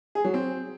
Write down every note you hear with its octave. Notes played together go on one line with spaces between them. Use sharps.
G#4
F#3
C4